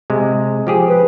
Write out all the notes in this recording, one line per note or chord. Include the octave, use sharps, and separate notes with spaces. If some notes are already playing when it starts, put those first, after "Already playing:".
C3 G#3
F3 G4 G#4
B4